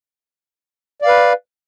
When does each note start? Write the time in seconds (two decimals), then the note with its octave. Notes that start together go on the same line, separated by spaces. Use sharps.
1.02 D5
1.04 F5
1.07 B4